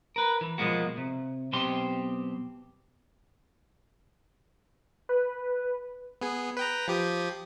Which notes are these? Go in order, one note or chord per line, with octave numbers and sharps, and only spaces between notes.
A#4 B4
E3
B2 F3 G#3 A#3 F#4
C3
B1 B2 C4 G4 C6
B4
B3 G#4
B4 G5 A#5
F3 G4 D#6